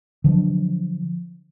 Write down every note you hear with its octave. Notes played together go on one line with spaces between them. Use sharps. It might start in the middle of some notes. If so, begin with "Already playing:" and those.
D3 F3 F#3 D4